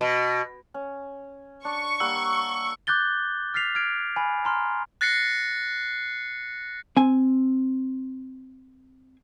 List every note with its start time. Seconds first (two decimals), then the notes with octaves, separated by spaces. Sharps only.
0.01 B2
0.74 C#4
1.65 D4 C#6
2.00 G3 A#3 F#5 E6
2.87 D6 F#6 G6 A6 G7
3.54 F6 A6 B6 C7 F7
3.75 F6 G#6 D7
4.16 G#5 B5
4.45 A#5 C6 F6
5.01 F#6 A6 A#6 C7 C#7
6.97 C4 G#5